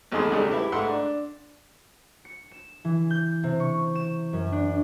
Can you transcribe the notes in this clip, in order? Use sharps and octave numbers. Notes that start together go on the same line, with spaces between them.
G#1 E2 A3 D#4 G#4 C6
C#2 G3 A3 D#4
E4 G4 B4 E5
G#2 A3 F#5 C6 E6
D4
C#7
E7
E3
G6
C3
C#6
E7
F#2
D4